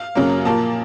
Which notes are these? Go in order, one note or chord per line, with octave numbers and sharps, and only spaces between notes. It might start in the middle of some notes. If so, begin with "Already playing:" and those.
Already playing: F5
F#2 C#3 F#3 A#3
A#2 F3 A#3 A5